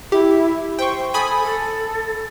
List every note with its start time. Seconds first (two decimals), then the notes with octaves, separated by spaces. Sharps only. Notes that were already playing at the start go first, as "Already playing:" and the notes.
0.12 E4 G4
0.79 C5 G5 C#6
1.14 A4 G#5 B5 D#6
1.44 A4